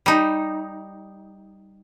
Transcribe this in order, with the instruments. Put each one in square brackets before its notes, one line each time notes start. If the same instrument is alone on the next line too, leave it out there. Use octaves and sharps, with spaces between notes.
[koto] G3 D#4